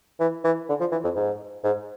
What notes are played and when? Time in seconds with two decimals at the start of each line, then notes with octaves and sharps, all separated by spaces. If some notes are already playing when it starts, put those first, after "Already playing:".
0.20 E3
0.44 E3
0.69 D3
0.80 F3
0.92 E3
1.04 F2
1.16 G#2
1.64 G#2